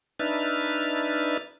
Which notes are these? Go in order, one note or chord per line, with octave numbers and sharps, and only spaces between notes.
D4 D#4 B4 E5 F6 A6